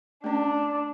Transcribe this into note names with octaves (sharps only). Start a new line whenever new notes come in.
A3 C#4 D4